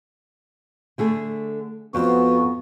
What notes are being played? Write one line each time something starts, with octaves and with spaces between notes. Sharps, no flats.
D3 A3 G#4
F2 F3 B3 F#4